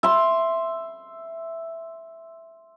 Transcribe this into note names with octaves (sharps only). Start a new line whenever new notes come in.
E5 C6